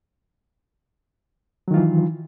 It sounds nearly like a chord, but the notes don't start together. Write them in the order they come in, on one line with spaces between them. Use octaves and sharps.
F#3 D#3 F4 E3